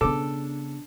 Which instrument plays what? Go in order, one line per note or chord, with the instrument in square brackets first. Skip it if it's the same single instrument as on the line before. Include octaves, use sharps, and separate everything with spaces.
[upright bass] C#3 B3 [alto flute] D4 [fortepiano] A4 D6